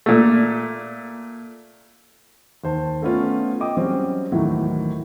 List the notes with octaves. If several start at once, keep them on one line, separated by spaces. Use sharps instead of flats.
A#2 A3
D#2 C5 A5
A3 B3 C#4 F4
D#5 G5 D6 D#6
F#3 G3 C4 C#4 G4
D#2 A2 D#3 E3 F#3